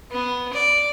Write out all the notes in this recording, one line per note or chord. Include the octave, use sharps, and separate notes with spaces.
B3
D5